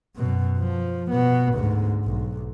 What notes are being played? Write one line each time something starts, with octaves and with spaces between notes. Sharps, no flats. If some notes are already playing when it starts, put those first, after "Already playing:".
F#2 B2
F3
B2 B3
D2 G#2
B1